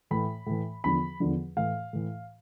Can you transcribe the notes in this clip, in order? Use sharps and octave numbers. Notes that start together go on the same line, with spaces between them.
A2 E3 B5
A2 E3
E2 D3 F3 B5
E2 D3 F3
A2 E3 F5
A2 E3